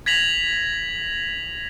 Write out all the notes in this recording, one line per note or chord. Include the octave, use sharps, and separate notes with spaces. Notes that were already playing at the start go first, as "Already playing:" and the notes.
G#6 A#6 B6 F7 F#7